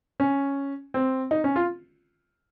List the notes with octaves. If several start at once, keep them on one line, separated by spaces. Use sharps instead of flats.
C#4
C4
D#4
C#4
F4